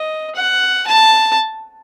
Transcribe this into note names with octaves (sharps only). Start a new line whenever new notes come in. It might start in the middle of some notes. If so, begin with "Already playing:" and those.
Already playing: D#5
F#5
A5